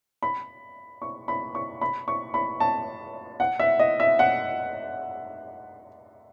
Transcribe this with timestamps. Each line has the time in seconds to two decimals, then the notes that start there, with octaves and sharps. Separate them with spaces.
0.23 B5
1.02 C#6
1.28 B5
1.55 C#6
1.81 B5
2.08 C#6
2.34 B5
2.60 A5
3.40 F#5
3.60 E5
3.79 D#5
4.00 E5
4.19 F#5